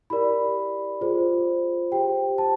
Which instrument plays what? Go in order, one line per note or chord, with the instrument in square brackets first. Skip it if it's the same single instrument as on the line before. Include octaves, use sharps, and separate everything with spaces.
[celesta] E4 G4 A#4 D5 B5
F4 G#4 C5
G4 C5 G5
A5